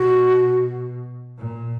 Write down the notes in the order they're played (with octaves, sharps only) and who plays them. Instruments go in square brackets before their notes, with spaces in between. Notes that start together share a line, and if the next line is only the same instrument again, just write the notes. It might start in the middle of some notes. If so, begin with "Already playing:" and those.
Already playing: [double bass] B2 [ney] F#4
[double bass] A#2